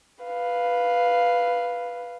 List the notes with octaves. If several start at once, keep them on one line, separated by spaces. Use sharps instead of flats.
B4 F5